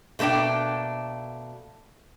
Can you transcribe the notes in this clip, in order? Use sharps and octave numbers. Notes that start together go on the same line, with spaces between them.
B2 A3 A#3 D4 G5